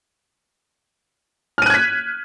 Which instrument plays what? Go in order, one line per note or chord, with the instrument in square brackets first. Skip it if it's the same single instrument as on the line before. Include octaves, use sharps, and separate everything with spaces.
[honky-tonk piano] F6
D#7
F#6
G#6
B6